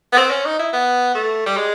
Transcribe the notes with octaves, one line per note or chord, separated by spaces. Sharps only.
B3
C4
C#4
D#4
E4
B3
A3
G3
G#3